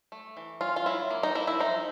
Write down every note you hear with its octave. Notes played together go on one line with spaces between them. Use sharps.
A3
E3
C#4 F4
F4
F#3 E4
A#3
D#4
A#3 E4
E4
F3 D#4